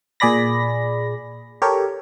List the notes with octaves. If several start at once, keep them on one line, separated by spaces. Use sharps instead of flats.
A#2 G#4 D5 B5 A#6
G4 A4 A#4 C#5